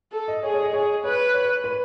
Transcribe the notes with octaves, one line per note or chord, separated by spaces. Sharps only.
A4
D#5
G#4 C#5
C#5
D#5
G#4 C#5
B4 C#5
C#5
B4